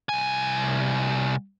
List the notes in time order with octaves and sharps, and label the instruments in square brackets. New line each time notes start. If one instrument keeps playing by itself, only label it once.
[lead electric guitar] C2 G#5